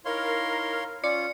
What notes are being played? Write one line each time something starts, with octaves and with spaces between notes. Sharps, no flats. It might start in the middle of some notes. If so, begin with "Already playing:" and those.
D#4 E4 A#4 C#5 F5 C6
C#4 F4 D5 C#7